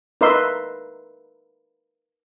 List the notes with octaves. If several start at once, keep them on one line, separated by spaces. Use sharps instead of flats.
D#4 A#4 B4 E5 C6 E6